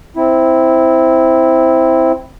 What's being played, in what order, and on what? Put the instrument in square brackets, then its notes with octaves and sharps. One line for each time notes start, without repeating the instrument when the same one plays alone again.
[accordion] C4 E4